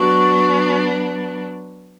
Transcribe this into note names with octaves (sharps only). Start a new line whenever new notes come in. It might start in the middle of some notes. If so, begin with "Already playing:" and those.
Already playing: F#3 B3 D4 F#4